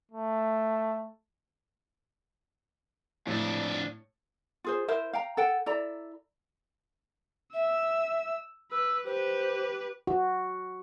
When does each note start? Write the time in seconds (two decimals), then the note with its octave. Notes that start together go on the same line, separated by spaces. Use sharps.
0.11 A3
3.27 F2 A2 D4
4.64 F4 G#4 C5
4.88 E4 A#4 C5 E5
5.13 F5 G5 A#5
5.37 A4 F#5 G5
5.66 E4 A4 D5 A#5
7.54 E5 E6
8.71 B4 E6
9.06 G4 B4 C5
10.07 F#4